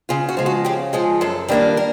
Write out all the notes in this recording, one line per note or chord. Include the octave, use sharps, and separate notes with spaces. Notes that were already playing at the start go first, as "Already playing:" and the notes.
C#3 F4
F#4
F3 G#3
F#4
C#3 G4
F3 G#3 G#4
F#2 A4
D#3 G3 A#3 D4
A#4